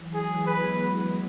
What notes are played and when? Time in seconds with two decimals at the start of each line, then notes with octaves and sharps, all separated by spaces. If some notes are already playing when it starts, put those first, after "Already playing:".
Already playing: E3 F#3
0.13 E3 G#3 G#4
0.46 F#3 B3 B4